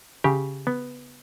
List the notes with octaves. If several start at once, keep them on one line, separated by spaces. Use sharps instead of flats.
C#3 G4
B3